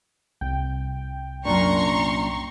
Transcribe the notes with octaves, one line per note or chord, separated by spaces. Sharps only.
C2 G5
F#2 A#2 D4 A#5 C6 C#6